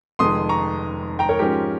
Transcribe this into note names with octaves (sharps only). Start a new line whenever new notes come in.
F1 F2 D#3 G#3 C6 D#6
A#5 C#6
G5 A#5
A#4 C#5
G#2 F3 G#3 C#4 G4 A#4